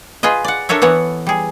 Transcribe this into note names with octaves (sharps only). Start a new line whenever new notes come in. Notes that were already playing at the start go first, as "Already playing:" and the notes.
F4 G#4 B4 D#5
D5 F#5
D4 A4 A#4 C#5 E5
E3 B3 C#5 F#5
G3 G#4